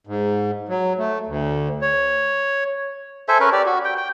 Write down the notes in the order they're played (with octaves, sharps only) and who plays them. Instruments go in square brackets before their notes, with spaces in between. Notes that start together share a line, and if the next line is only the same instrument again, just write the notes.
[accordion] G#2
F#3
A3
D2
C#5
[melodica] A4 C5 E5 G#5
C#4 A#4 B4
G4 D5
F#4
G5
G5